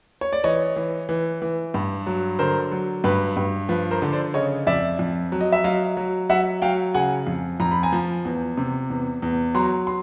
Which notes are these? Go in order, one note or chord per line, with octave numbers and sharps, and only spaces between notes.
C#5
D5
E3 C#5 D#5
E3
E3
E3
G2
F#3
D3 A#4 C5
F#3
G2 B4
G2
F3 B4
A#4 C5
D3
C5 D5
C#3 C#5 D#5
F2 D5 E5
F2
F#3
D#5
E5
F#3 D#5 F5
F#3
F#3 E5 F#5
F#3 F5 G5
C#3 F#5 G#5
F2
F2 A#5
B5
G#5 A#5
F3
E2
C3
E2
E2
F#3 A#5 C6
C6